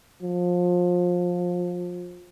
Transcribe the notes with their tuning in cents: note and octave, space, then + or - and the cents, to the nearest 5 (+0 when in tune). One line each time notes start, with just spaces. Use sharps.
F3 +25